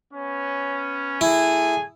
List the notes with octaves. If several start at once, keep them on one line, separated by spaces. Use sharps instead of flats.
B3 C#4
A3 E4 G#4 G#5